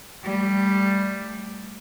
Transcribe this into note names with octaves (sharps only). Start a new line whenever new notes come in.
G3 A3